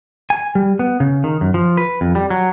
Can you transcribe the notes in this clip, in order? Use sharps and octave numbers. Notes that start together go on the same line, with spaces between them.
G#5
G3
B3
C#3
D#3
F#2
F3
B4
F2
G3
F#3